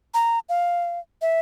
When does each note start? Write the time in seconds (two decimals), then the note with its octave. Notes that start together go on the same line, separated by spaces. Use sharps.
0.14 A#5
0.49 F5
1.22 E5